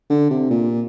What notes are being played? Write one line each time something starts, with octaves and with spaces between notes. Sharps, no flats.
D3
C3
A#2